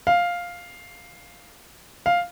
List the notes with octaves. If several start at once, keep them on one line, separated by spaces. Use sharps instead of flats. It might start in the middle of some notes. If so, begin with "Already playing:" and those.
F5
F5